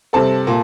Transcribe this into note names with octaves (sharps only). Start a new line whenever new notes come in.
C3 G3 C4 A4 A5
A#2